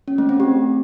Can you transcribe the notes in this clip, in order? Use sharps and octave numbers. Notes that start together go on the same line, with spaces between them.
C#4
A3
C4
G4